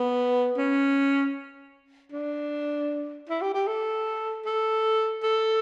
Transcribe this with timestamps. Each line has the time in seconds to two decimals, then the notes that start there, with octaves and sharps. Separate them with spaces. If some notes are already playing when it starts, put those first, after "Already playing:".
Already playing: B3
0.58 C#4
2.12 D4
3.30 E4
3.42 G4
3.54 G4
3.67 A4
4.46 A4
5.23 A4